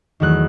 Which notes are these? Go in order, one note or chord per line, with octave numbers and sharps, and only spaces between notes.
E2 D#3 F#3 A3 F#6